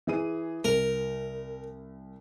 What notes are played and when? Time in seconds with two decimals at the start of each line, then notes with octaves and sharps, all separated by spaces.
0.07 E3 G#4 D#7
0.64 C2 A#4